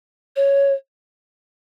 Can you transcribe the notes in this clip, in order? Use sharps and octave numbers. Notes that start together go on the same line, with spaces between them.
C#5